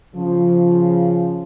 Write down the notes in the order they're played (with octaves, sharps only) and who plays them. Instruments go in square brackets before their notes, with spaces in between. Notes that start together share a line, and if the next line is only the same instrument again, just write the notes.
[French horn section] C#3 F3